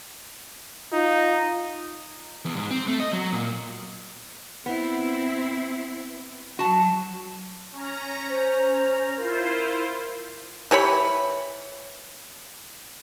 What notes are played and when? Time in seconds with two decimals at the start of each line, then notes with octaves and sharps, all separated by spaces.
0.93 D#4 F4
2.45 E2
2.57 G#2
2.71 C4
2.88 A3
3.00 D#5
3.13 F#3
3.33 A#2
4.66 B3 C4 E4
6.59 F#3 F#4 A5
7.72 C#4 A#5
8.30 C5
9.17 E4 F4 A#4 C5
10.71 E3 G4 C#5 B5